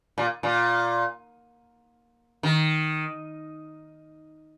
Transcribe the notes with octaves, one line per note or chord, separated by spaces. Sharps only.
A#2
A#2
D#3